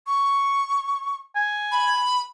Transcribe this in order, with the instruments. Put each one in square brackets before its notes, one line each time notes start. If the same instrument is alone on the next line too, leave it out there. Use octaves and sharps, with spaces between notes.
[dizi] C#6
[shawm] G#5
[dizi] B5